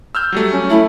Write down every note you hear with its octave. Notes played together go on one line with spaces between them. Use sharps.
E6 F6 G6
F#3 G3 A3
C#4
A3 E4